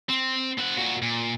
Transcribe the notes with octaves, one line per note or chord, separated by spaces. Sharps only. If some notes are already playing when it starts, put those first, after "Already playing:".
C4
C4 F#5
A#2 F#4
A#2